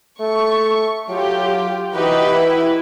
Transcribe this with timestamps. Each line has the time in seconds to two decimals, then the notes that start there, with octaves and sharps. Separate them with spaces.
0.20 A3 C#6
1.09 F#3 F4 G4
1.95 E3 D#4 F#4 G4 B4
2.28 E4